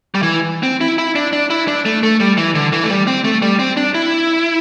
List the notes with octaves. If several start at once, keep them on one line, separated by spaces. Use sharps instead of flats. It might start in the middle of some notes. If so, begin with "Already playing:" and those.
G3
E3
C4
E4
E4
D4
D4
E4
D4
A3
A3
G3
E3
D3
E3
A3
G3
C4
A3
G3
C4
D4
E4